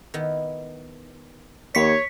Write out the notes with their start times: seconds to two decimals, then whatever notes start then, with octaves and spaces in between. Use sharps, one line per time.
0.14 D#3 B3 E4
1.75 D#2 C#5 B6 C#7